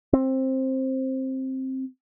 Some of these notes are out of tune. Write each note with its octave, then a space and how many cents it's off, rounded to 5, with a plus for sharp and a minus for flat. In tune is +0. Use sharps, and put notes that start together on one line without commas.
C4 +10